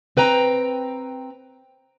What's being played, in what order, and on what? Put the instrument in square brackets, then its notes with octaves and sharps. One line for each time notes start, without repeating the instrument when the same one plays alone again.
[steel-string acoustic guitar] C4 B4 G5 A#5